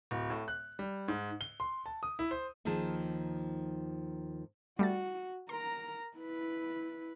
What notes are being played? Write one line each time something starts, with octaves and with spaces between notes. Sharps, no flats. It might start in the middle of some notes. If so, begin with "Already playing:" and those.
D1
A2
F#6
G3
G#2
G7
C6
A5
D#6
E4
C5
D#2 D#3 F3 G#4 A5
G3 A3 F#4 A6
A#4 A#5 C6
E4 B4